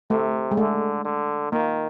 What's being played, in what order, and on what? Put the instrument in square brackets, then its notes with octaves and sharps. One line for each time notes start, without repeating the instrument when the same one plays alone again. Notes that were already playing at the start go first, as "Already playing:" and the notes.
[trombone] C3 [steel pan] A3
[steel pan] G#3
[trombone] D3 [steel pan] A3
[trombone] D3
[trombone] D#3 [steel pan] A#3